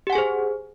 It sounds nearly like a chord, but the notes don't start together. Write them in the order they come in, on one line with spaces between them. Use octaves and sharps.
G4 F#5 G#5 G#4 C5